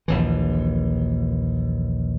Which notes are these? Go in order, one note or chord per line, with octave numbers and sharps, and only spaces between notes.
A#1 D#2 E3